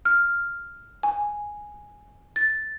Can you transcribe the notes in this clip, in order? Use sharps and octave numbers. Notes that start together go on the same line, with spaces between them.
F6
G#5
A6